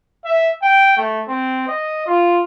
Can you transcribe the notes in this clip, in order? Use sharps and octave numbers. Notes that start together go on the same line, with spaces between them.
E5
G5
A3
C4
D#5
F4